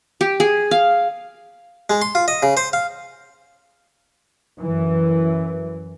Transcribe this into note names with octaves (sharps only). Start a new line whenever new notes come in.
G4
G#4
F5
G#3
C6
F4
D#5
C#3
C5
F5
F#2 E3